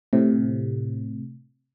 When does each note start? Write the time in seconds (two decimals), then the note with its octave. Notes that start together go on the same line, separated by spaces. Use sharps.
0.13 A2 C3